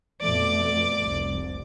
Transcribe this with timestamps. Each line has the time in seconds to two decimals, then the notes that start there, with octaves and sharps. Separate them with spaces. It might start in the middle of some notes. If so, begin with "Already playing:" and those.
0.21 F2 B2 A3 D5 D6
1.03 F1 C2